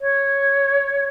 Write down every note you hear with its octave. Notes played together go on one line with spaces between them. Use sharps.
C#5